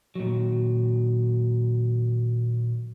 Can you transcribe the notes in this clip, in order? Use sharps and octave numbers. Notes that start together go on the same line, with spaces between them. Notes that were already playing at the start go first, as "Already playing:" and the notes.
A#2 D#3 F#3